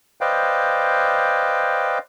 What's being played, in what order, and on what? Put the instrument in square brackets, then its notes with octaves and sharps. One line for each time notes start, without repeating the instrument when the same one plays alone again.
[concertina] B4 C5 D5 D#5 F5 G5